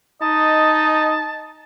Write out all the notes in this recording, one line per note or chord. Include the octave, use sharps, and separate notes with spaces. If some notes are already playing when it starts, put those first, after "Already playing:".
D#4 D#5 A5